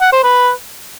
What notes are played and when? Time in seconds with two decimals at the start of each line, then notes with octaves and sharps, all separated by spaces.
0.01 F#5
0.12 C5
0.24 B4